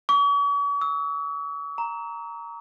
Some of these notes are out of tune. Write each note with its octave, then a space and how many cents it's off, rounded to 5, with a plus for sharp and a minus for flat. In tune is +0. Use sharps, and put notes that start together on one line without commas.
C#6 +45
E6 -40
A#5 +0